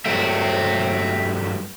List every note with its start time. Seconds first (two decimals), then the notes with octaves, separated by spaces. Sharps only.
0.06 G2 F#3 A3 E5 G5